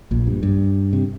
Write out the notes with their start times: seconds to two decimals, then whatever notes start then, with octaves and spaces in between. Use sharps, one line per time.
0.11 A#1 A#2
0.27 G2
0.43 G2
0.93 C3